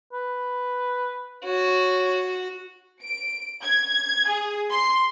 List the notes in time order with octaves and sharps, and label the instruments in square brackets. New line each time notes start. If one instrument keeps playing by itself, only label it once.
[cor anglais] B4
[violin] F#4 [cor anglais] C#5
[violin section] D7
G#6
G#4
C6